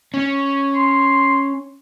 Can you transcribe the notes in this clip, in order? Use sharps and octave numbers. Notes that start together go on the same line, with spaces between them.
C#4
C6